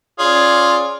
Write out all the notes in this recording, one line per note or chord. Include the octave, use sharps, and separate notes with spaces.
C#4 F4 G#4 C#5 D5